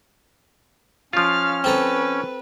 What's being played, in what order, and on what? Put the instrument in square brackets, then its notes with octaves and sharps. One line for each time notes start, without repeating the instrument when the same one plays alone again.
[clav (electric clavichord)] F3 F4 [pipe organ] C#4 [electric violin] F5 F6
[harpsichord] C4 A4 A#5 [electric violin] B4